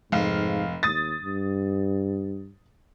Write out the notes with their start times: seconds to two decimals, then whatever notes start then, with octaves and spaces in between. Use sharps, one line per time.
0.12 F1 G#2 F5
0.83 D#2 D#6 A6
1.21 G2